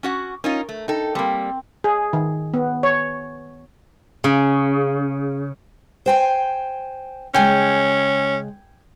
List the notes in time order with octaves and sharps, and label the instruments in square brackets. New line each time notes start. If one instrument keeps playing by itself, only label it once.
[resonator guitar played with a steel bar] C#4 F#4 F#5 [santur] D6
[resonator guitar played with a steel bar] C#4 D#4 F4 [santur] A#4
[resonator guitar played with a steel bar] A3
[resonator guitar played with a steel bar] D#4 A4 [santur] G5
[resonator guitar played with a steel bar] G3 A#3 [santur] C4
[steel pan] G#4
D#3
B3
C#5
[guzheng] C#3
[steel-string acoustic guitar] C5 G5 G#5
[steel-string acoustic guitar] C#3 G#3 [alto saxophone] C#4 [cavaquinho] G5 G#5